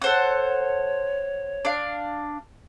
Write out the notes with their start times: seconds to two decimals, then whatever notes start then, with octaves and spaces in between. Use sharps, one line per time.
0.02 A4 C5 C#5 F#5
1.65 D4 F5